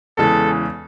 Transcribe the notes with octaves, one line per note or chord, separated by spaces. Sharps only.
E2 C#3 E3 G#3 A4